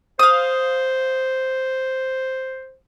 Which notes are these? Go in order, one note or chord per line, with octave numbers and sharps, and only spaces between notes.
C5 F5 D#6